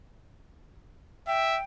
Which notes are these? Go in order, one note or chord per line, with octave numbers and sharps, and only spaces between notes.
E5 G5